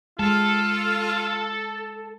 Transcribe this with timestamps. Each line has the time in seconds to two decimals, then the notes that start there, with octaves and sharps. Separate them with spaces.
0.19 G#3 F4 A4